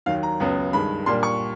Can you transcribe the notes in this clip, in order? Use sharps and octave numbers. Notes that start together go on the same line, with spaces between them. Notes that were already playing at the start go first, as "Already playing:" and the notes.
D#2 D#3 F#3 F5
A#5
C#2 C#3 F#3 B3
G2 D#3 G#3 B5
A#2 G3 A#3 D4 C6
C#6